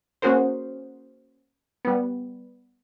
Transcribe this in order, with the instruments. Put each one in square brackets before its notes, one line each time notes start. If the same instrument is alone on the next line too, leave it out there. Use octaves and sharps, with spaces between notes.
[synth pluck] A#3 C#4 F#4 G#4 A#4 C5
G3 B3